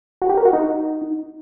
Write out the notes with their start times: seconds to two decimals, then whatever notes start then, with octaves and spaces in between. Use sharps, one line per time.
0.22 F#4
0.29 G4
0.37 A#4
0.45 F#4
0.53 D#4